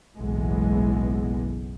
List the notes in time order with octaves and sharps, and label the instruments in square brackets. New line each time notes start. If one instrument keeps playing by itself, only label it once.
[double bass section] F#1 B1 A2 E3 G#3 B3